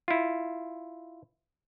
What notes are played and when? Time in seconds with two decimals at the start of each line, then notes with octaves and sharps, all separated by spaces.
0.08 E4 F4